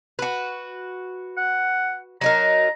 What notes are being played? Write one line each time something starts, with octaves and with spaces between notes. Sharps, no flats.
F#4 B4
F#5
F#3 D#4 A#4 A#5